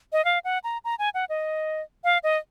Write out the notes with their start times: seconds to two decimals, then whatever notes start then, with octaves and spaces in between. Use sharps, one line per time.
0.13 D#5
0.25 F5
0.45 F#5
0.64 A#5
0.85 A#5
0.99 G#5
1.14 F#5
1.29 D#5
2.04 F5
2.23 D#5